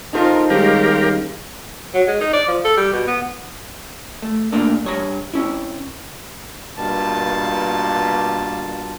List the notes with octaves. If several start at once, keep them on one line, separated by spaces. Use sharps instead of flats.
D#4 F4 A4 A#4 C5
D#3 G3 G#3 C#4 G4 A#4 F5
F#3
G#3
D#4
D5
F3
A4
G3
B2
B3
A3
A#2 A3 A#3 D4
G2 C#5 A#5
C4 C#4 E4
G2 B2 A#3 F4 A5